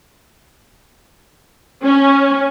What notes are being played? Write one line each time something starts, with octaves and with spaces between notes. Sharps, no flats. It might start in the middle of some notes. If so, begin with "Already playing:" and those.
C#4